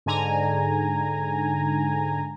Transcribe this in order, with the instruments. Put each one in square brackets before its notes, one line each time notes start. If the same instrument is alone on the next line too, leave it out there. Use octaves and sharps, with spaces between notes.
[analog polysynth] G#2 D3 G#5 A#5